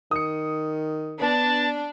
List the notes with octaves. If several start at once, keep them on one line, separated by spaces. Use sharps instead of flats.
D#3 D#6 C#7
B3 D4 A5